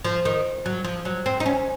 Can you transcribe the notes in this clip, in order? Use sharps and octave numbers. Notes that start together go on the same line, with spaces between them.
F3
D#3
F#3
F3
F#3
C4
D#4
C#4